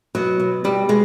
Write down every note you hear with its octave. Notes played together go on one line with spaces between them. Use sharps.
B2 F#3
B2
B2 G3
B2 G#3